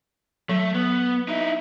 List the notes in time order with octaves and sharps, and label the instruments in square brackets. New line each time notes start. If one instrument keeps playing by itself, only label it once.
[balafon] F#3 [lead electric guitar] A3
[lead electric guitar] B3
D#4 E4